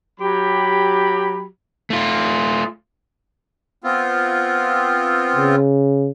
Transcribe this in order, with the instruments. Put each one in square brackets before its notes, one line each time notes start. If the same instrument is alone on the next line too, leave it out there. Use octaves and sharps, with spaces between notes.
[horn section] F#3 G4 B5
[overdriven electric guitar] A3 F4
[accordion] B3 C4 F4
[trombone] C#3